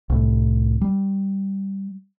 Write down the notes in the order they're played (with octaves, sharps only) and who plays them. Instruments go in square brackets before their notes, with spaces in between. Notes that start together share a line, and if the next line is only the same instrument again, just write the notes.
[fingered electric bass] C2 A2
G3